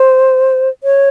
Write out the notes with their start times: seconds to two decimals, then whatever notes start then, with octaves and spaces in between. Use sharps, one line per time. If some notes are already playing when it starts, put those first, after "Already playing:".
Already playing: C5
0.84 C#5